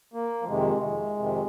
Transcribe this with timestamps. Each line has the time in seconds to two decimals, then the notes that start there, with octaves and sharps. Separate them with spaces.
0.14 A#3
0.42 F3
0.48 F2 C3 D#3 G#3
0.83 G#3
1.18 F2 C3 D#3